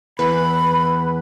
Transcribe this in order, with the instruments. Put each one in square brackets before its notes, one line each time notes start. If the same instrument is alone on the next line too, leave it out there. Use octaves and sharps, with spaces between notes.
[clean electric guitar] E2 [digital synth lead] B4 [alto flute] B5